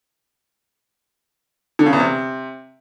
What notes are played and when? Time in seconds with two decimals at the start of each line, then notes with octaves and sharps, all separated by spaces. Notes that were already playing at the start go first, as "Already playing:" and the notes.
1.79 D3
1.86 C#3
1.93 E2
2.00 C3